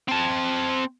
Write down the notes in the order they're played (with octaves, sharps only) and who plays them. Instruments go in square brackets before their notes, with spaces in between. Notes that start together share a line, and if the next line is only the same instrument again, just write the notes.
[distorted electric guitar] C4 A5